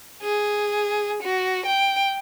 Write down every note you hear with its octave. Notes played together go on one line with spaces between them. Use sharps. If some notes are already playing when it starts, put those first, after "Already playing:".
G#4
F#4
G5